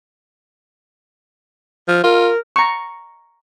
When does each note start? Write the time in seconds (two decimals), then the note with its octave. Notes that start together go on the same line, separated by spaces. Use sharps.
1.88 F3
2.04 F4 A#4
2.56 A#5 C#6